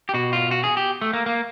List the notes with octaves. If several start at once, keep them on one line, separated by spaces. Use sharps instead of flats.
G4
B2 F#4
F4
F#4
G#4
G4
A3
A#3
A#3